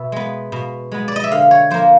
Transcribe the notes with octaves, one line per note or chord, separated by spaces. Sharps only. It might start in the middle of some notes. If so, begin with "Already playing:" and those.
Already playing: B2 E5
G#3 B3
B2
G#3 B3
D5
D#5
E5
D3 F5
C#5
F3 A#3 C5